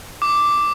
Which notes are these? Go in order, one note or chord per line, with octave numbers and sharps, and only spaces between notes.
D6